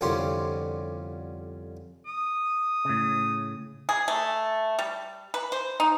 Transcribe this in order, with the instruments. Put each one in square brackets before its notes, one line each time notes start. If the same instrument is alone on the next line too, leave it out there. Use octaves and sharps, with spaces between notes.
[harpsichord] C2 F2 D3 C#4 G4 C6
[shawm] D#6
[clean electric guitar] A2 C#3
[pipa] G#4
A3
G3
B4
C5
D#4